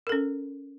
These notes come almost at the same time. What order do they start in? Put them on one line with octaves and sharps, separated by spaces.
A#4 A4 C#4